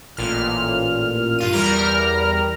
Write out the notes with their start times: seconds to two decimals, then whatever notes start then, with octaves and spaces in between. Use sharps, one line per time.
0.17 A1 A#2 F6
1.39 G2 F4 D#7
1.53 E2 G3 A#4 A#5 F6